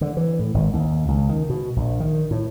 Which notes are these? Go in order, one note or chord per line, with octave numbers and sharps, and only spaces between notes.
D3
E3
A2
G#1
D#2
C#2
D#3
B2
A#1
D#3
A2